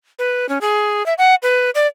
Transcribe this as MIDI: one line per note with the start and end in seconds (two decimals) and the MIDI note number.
0.19 0.49 71
0.49 0.58 61
0.61 1.05 68
1.06 1.14 76
1.18 1.35 78
1.43 1.70 71
1.75 1.87 74